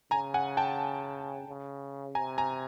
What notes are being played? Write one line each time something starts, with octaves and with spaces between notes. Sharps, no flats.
C#3 G#5 A#5
F#5 G#5
G5 A5
C#3
C3 G#5 A#5
G#5 A#5